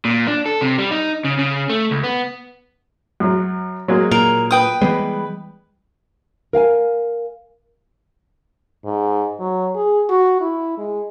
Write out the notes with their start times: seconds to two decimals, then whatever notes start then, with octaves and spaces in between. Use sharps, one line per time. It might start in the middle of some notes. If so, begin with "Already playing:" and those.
0.05 A#2
0.27 D4
0.46 A4
0.61 C3
0.78 G3
0.91 D#4
1.24 C#3
1.39 C#3
1.69 A3
1.91 C#2
2.04 B3
3.20 F#2 F#3
3.88 F#3 G#3 A#3
4.11 A#2 A#4
4.51 B4 G5 D#6
4.82 E3 G3 G#3 B3
6.53 A#4 F5 G5 G#5
8.85 G#2
9.40 F#3
9.75 G#4
10.09 F#4
10.41 E4
10.78 G#3